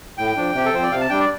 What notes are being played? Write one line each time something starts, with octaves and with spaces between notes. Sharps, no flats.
A2 G5
F3 D4
C3 G4
A4
F3 C4 C5
D5
C3 F5
A5
G3 D4 G5
D5